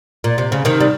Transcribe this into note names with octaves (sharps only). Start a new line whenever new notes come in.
A#2
C3
C#3
C3 D#3
G3